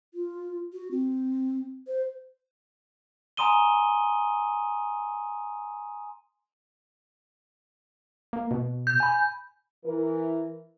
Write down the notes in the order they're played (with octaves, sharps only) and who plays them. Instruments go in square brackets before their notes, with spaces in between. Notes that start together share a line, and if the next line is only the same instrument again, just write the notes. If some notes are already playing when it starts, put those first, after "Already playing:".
[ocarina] F4
F#4
C4
C5
[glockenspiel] G#5 A#5 C6 D#6 D#7 G7
[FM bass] A#3
B2
[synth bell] G6
[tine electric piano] G#5 B5
[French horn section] E3 A#4